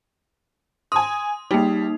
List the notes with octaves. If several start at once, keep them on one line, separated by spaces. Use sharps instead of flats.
G#5 C6 D#6
G3 A#3 D#4